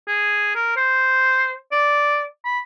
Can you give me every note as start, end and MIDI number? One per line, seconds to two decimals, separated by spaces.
0.08 0.51 68
0.55 0.74 70
0.77 1.56 72
1.72 2.26 74
2.45 2.59 83